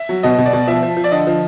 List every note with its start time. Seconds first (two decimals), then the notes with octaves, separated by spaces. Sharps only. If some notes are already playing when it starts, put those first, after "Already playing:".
Already playing: E5
0.09 F#3
0.23 B2 D#5
0.38 B2
0.46 D5
0.53 B2
0.67 F3 E5
0.82 F3
0.97 F3
1.04 D5
1.12 D3 D#5
1.27 F3